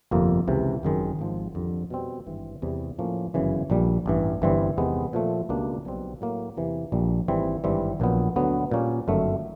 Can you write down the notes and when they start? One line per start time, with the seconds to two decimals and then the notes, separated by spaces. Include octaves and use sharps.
0.11 G1 F2 C3 F3 A#3
0.48 C#2 C3 E3
0.83 G#1 F#2 D#3 G#3
1.19 G#1 G#2 F3
1.55 F2 D3 G3
1.90 B2 G3 C4
2.27 G#1 G2 E3
2.62 E2 C3 E3 G3
2.98 A2 F3 A#3 C#4
3.34 G1 F#2 C#3 E3
3.70 A#1 A#2 G3
4.06 A1 G2 E3
4.42 G1 G2 E3 G3 C4
4.77 E2 C3 D#3 G#3 B3
5.13 A#2 F3 A3
5.49 C#2 B2 G3 A#3 D4
5.85 B1 B2 G3 C4
6.21 A2 F#3 A#3
6.57 E2 C3 E3
6.92 A#1 A#2 G3
7.28 G#1 G#2 E3 G3 C4
7.64 G#1 G2 E3 G3 C4
8.00 A#1 A#2 F#3 B3
8.36 D2 D3 F#3 B3
8.71 A#2 G3 A#3 C#4
9.08 G1 F#2 D#3 F#3 A3